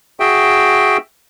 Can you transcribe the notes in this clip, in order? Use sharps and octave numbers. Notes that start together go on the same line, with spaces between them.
F#4 G#4 E5 G5